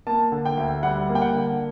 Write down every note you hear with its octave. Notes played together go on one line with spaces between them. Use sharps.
A#3 A5
D3
G5
D2
G3 F#5
A#3
G5
F#5
D3